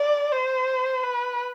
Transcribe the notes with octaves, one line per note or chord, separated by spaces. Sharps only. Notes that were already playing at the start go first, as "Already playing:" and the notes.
Already playing: D5
C5
B4